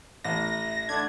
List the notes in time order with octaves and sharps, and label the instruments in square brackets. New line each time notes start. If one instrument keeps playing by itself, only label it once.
[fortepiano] A1 [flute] E5 [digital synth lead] A#6
[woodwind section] D3 A3 D4 [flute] D6 [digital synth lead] G#6